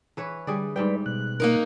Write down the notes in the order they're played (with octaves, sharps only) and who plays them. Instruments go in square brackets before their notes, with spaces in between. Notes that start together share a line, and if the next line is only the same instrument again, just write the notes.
[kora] E3 B4 C#5
[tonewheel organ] D3 [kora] G3 G#4 D5
[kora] G#2 G3 G5 [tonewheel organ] B4 D5
[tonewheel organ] B2 F#6
[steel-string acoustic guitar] A#3 D#4 A#4